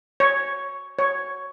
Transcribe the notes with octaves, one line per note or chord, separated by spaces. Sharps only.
C#5
C#5